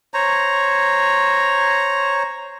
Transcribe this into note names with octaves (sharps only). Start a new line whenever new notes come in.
C5 C#5 A#5